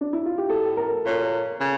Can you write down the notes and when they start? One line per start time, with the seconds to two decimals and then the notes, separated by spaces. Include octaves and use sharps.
0.01 D4
0.13 E4
0.26 F4
0.38 G4
0.49 A2 A4
0.77 A#4
1.05 A#2 C#5
1.60 C#3